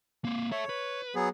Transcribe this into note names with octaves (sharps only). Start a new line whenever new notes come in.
A#3 C4
A4 C#5 E5
B4
F#3 B3 G#4